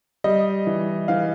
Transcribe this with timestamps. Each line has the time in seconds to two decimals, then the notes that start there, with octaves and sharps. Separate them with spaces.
0.24 G3 D#5
0.67 E3
1.08 E3 F5